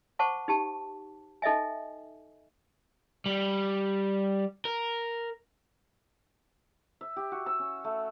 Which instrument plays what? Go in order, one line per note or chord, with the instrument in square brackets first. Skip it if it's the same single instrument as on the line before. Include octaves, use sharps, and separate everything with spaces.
[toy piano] C5 F#5 A5 C#6 D6
D#4 G4 A5
D#4 A4 D#5 E5 G#5
[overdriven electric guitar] G3
A#4
[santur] E5
G4
F#4
E6
C#4
A3